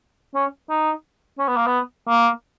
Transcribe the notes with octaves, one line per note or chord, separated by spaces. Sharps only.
C#4
D#4
C#4
B3
A#3
B3
A#3